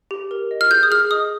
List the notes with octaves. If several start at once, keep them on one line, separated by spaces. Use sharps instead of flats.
G4
A#4
D#5
F6
G#4 G6
D#6
G#4 F6
D#5 D#6